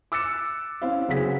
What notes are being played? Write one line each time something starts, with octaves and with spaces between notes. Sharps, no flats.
D6 E6 F#6 A6 C#7 E7
C4 C#4 E4 C5 F5
F#1 C#3 B3 F#4 G#4 B6